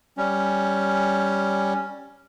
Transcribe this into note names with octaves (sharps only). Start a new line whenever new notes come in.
G3 C#4